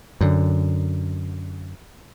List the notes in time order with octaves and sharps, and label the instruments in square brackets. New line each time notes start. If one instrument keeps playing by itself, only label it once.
[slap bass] F#2 D3